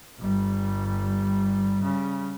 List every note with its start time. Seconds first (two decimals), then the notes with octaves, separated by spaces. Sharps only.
0.19 G1 G3
1.82 C#3 G3